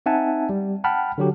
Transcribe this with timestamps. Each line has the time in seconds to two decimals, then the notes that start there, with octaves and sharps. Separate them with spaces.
0.06 C4 D#4 E5 F#5 G#5 A5
0.49 G3
0.84 F#5 G5 A5 B5 F6
1.18 D3 F#3 G4